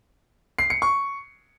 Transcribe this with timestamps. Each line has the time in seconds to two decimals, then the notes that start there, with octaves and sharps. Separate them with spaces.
0.59 C7
0.70 C#7
0.82 C#6